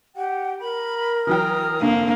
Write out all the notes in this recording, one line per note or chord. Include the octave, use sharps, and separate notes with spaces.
G4 F#5 G5
A#4 B5
E3 F#3 G5 A#5 D#6 F6
F1 G2 D3 A#3